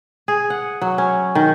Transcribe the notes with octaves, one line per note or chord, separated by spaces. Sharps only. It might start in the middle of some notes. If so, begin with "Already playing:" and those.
G#4
F#5
F#3
C#4
D#3